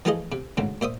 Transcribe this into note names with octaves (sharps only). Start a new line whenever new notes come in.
E3 F3 A3 F4 G#4 D#5
C3
D2 G#2 C#3
A#2 C5 E5 D#6